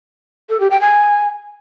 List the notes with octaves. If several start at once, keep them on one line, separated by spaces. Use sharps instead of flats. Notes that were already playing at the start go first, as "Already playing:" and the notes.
A4
G4
G5
G#5